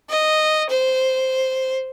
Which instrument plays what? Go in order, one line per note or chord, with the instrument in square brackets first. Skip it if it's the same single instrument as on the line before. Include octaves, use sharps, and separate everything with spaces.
[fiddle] D#5
C5